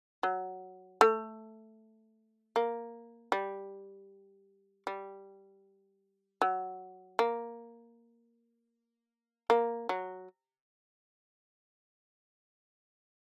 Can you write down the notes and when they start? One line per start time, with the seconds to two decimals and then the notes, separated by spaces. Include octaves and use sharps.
0.23 F#3
1.01 A3
2.56 A#3
3.32 G3
4.87 G3
6.42 F#3
7.19 A#3
9.50 A#3
9.89 F#3